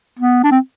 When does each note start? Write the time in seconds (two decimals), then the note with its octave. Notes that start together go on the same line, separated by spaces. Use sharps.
0.19 B3
0.44 D4
0.51 C4